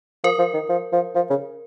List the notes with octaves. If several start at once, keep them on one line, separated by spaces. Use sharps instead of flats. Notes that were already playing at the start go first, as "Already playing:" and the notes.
F3 A#4
F3
D#3
F3
F3
F3
C#3